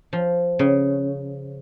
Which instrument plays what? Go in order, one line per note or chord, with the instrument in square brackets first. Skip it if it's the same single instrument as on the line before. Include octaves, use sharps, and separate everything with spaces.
[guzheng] F3
C#3